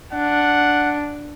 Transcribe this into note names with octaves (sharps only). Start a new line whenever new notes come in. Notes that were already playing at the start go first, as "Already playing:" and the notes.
D4 F#5